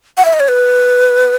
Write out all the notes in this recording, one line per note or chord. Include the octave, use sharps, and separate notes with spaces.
F#5
E5
D#5
C#5
B4